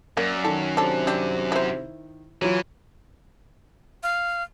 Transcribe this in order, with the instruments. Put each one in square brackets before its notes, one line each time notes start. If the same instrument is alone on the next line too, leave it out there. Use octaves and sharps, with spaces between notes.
[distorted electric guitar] F#2 [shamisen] A#3 [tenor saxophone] D5
[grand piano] D#3 [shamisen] A4
[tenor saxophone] C3 [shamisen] D4 A4
[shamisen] G3 C4 D4
E4 C5
[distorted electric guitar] E3 [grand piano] F#3 F4
[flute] F5